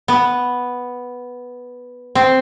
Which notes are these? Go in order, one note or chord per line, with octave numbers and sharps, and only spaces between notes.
B3
C4